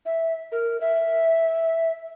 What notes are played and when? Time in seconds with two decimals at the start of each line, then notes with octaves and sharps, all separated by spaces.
0.05 E5
0.52 A#4
0.81 E5